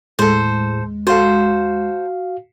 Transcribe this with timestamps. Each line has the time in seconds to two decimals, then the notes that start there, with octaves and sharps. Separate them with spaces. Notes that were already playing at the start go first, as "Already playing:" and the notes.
0.19 D#2 A2 G#3 A4 C5
1.07 F#4 A4 C5 F5